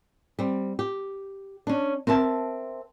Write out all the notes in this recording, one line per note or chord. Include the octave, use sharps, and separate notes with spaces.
G3 C4
G4
C#4 D4
C4 A#4 E5 A5